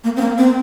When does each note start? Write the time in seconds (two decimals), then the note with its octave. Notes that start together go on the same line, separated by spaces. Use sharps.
0.04 A#3
0.17 C4
0.21 A#3
0.38 C4